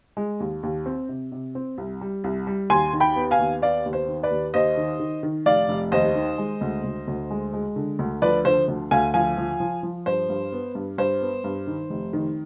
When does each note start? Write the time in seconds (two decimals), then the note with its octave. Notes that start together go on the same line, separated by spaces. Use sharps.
0.17 G#3
0.40 D#2
0.63 D#2
0.86 C4
1.09 C3
1.32 C3
1.55 C4
1.78 C2
2.01 G3
2.24 C2
2.47 G3
2.70 D#2 G#5 C6
2.93 D#3
3.00 G5 B5
3.16 B3
3.31 F5 G#5
3.39 D#2
3.62 B3 D5 F5
3.85 D#2
3.93 C5
4.08 D#3
4.23 B4 D5
4.31 D#2
4.54 D#2 C5 D#5
4.77 D#3
5.00 D#3
5.23 D#3
5.46 F1 D5 F5
5.69 F1
5.92 D#2 C5 D#5
6.15 D#3
6.38 G#3
6.61 D2
6.84 D2
7.07 D2
7.31 G#3
7.53 G#3
7.76 D3
7.99 D2
8.22 F3 B4 D5
8.45 D3 C5
8.68 D2
8.91 D2 F5 G#5
9.14 F3 F5 G#5
9.37 F3
9.60 F3
9.83 F3
10.06 G2 C5
10.29 G2
10.52 B3
10.75 G2
10.98 G2 C5
11.21 B3
11.44 G2
11.67 D#3
11.90 F1
12.13 D#3